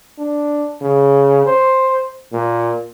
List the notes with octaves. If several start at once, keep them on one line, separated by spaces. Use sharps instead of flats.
D4
C#3
C5
A#2